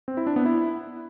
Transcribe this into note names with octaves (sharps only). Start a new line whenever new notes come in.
C4
E4
D4
B3
E4